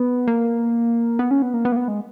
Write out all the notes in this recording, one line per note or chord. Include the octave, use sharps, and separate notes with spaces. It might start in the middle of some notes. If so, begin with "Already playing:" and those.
Already playing: B3
A#3
B3
C#4
B3
A#3
B3
A#3
B3
G#3